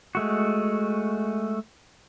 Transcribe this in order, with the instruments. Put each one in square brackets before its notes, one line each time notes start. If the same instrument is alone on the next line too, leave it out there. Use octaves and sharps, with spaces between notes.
[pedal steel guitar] G#3 A3 F#4